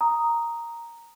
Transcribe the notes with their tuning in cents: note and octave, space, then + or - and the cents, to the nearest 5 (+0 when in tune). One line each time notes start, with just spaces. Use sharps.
A#5 +0 D#6 +0